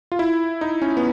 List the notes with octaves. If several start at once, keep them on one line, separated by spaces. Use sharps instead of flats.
F4
E4
D#4
C#4
B3